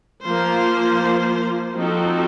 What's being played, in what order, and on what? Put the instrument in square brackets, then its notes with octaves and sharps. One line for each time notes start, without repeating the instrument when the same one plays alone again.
[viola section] F3 A#3 F4 C5
F3 C4 D#4 F#4 A4